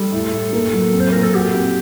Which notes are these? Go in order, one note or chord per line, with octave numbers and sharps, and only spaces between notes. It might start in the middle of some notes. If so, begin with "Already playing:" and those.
Already playing: G3 A4
A2
A2
A#3
F#3
C4
C5
A#2 A#4
A4
F#4 G4
C4